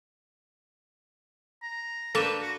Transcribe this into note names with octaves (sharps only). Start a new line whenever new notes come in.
A#5
A#3 D4 A4 B4 G5 C#6 E7
F#4